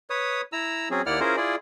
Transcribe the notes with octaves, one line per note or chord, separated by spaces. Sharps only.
B4 C#5 D#6
E4 A#5 E6
F#3 C4 C#4 G#4
D#2 A#3 E4 D5 F#5 F6
C#4 E4 F4 G#4 A#4 C5
E4 F4 G#4 D5